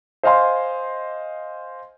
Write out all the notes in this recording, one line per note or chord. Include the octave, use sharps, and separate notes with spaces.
C5 D#5 F5 G#5 C6